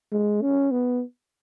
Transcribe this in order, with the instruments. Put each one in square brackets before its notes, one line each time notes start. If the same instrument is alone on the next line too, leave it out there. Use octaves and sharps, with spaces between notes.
[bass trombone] G#3
C#4
B3